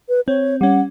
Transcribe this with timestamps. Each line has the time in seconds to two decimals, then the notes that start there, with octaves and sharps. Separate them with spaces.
0.09 B4
0.28 C4 C#5
0.61 G3 C#4 F#5